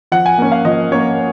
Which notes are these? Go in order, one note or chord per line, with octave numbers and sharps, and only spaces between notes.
F3 F#5
G#5
A#3 C#4
F5
F3 D#5
A#3 C#4 C#5